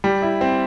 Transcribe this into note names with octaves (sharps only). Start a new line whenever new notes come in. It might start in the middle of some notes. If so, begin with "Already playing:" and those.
G3
E4
C4